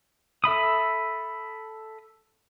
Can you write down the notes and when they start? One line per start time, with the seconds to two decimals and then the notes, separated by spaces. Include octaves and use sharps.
0.44 A4 E5 B5 D#6